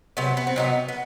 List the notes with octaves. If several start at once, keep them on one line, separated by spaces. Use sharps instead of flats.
C3 F#3 B3
B3
C4
C3 F#3 B3 D#4
B3